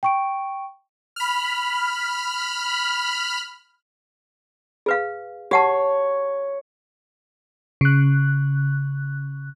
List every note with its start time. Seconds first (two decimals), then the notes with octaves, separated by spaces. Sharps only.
0.03 G5 C#6 D7
1.16 B5 F6
4.86 G#4 B4 F5
5.51 G4 C#5 F#5 A5
7.81 C#3 F#6